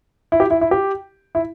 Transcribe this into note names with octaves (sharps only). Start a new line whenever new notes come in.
E4
G4
E4
E4
G4
E4